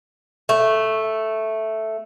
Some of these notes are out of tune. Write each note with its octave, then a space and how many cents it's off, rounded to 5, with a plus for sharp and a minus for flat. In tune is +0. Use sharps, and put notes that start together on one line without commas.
A3 +0